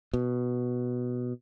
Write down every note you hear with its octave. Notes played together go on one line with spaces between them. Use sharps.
B2